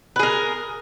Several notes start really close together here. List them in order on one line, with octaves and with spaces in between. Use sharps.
B4 G#4 A#4